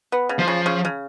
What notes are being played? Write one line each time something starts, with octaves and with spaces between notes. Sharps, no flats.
B3
C#3
F3
C#3
C#3
C#3